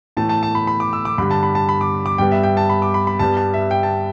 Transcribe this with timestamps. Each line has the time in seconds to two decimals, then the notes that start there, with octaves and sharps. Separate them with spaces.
0.17 A2 E3 A3 A5
0.29 A5
0.43 A5
0.55 B5
0.67 B5
0.80 D6
0.93 E6
1.05 D6
1.18 G2 D3 G3 B5
1.31 A5
1.43 B5
1.55 A5
1.69 B5
1.81 D6
2.06 D6
2.18 G2 G3 B3 G5
2.32 E5
2.43 G5
2.57 A5
2.70 B5
2.82 D6
2.94 B5
3.07 B5
3.19 G2 G3 B3 A5
3.37 A5
3.54 E5
3.71 G5
3.83 A5